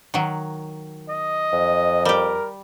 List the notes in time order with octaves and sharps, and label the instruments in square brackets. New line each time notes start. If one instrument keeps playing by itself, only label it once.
[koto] D#3 F#3
[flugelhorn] D#5
[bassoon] F2
[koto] G3 G4 [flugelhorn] A#4